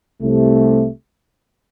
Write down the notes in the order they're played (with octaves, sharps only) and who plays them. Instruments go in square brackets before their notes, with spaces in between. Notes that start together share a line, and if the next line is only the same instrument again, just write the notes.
[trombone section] C2 C3 A3